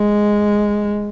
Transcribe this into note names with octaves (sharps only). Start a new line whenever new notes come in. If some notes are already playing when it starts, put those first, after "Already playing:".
Already playing: G#3